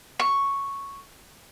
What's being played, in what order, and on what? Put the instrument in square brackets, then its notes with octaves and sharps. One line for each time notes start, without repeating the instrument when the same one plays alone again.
[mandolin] C#6